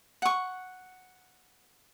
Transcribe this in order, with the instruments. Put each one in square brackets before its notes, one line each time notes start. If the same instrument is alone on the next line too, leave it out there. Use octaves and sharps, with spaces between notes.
[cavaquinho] F#5 C#6